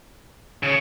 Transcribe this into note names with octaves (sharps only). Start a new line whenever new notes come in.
C#3